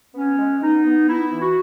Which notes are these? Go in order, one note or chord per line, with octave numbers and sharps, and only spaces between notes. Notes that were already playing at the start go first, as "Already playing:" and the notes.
B3 C#4
G#3
B3 D#4
B3
B3 E4
E3
F#4